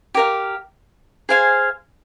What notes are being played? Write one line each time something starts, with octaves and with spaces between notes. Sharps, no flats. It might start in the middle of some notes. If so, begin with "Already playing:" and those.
G4 A#4 F5
G#4 C5 F5 G#5